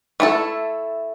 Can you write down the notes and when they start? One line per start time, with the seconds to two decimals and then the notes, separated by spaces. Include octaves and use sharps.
0.20 A3 E4 A4